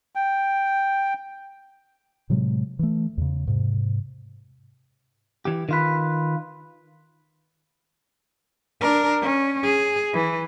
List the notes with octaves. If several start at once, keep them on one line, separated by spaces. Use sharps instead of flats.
G5
A2 C3 F#3 G#3
E3 A3
E2 C#3
G#2 C3
E3 G4
D#3 F4 B4
D4 A#4
C#4
G#4
E3